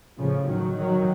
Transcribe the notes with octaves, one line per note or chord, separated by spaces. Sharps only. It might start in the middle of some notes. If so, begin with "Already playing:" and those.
A2 C#3 F3
D#3 F#3
D#3 F#3